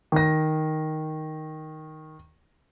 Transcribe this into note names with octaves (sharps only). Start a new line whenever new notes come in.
D#3 A#6